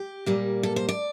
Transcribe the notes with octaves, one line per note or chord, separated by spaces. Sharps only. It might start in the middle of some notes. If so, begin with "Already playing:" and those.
Already playing: G4
A#2 G3 A#3
A4
C5
D5